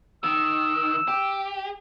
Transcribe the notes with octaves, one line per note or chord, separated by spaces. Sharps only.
D#3 E6
G4